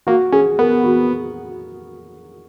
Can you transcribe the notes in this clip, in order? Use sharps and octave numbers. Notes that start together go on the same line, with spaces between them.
A#3 F#4
C#4 G#4
B3 A#4
F#4